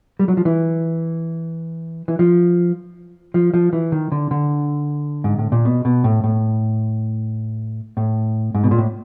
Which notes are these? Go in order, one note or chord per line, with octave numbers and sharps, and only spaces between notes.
G3
F#3
F3
E3
E3
F3
F3
F3
E3
D#3
D3
D3
G#2
A2
A#2
B2
B2
A2
A2
A2
G#2
B2
A#2
A2